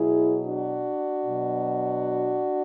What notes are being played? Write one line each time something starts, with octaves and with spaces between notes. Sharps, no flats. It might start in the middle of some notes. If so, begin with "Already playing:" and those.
Already playing: B2 F#3 E4 G#4
D4 F#4
B2 F#3